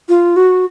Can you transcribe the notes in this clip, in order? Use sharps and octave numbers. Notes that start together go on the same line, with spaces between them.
F4
F#4